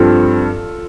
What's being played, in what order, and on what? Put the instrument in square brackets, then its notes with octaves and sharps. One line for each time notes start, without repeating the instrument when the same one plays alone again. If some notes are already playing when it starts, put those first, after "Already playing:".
Already playing: [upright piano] G2 F3 C4 F4 A4